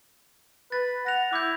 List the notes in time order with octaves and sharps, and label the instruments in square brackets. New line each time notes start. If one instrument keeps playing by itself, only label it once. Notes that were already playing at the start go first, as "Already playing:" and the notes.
[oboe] B4 [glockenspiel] A6
[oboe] F#5 [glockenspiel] A#6 F7
[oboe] E4 [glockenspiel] D6 G6